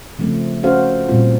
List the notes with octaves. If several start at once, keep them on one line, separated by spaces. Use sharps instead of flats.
C#3 F3 A3 C4
C#4 F#4 A4 C5 F5
A#2 G3 C4 F4